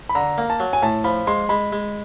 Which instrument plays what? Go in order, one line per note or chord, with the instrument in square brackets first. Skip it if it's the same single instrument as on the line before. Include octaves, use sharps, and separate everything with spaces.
[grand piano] B5
[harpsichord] D3 [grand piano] A#5
[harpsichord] A#3
[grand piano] A5
[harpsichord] F#3
[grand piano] G#5
[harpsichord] A2 [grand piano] A5
[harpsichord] F3 [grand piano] B5
[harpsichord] G#3 [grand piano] C6
[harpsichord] G#3 [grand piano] B5
[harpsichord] G#3